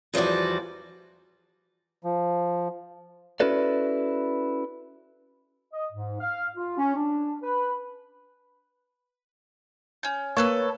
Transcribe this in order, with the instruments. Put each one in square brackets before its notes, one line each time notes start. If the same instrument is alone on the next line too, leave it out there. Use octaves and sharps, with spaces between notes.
[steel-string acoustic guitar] E2 F3 G3 F#4 D5
[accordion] F3
[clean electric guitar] C#4 E4 F#4 A4 B4 D5
[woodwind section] D#5
G#2
F5
F4
C#4
D4
B4
[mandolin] C#4 G6
[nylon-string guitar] A#3 [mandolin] A4 B4 A5 [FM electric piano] C#5